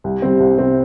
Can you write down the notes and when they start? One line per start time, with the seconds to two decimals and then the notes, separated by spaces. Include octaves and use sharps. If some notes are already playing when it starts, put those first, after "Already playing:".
0.04 C2
0.22 C3 G3 C4
0.40 C2
0.58 C3 G3 C4